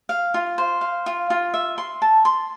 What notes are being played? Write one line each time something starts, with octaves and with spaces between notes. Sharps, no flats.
F5
F4
C5
F5
F4
F4
E5
C6
A5
C6